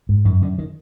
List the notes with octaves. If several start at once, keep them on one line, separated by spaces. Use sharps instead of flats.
G#2
F#2 D#3
F#2 D3
D#3